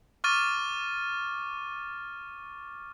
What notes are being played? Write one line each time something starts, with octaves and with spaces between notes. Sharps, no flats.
C#6 D6 F6 A6 D#7